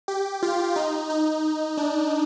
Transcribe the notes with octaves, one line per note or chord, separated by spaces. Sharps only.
G4
F4
D#4
D#4
D4